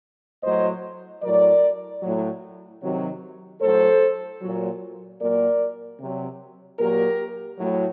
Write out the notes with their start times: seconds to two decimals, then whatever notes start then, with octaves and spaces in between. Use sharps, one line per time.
0.43 A2 F#3 C5 D#5
1.22 A2 F#3 A#4 D5
2.02 A2 F#3
2.82 C3 D#3 F#3
3.61 A2 F#3 A4 C5
4.41 A#2 F#3
5.20 A#2 F#3 A#4 D5
6.00 C3 F#3
6.79 A#2 F#3 G4 A#4
7.58 A2 F#3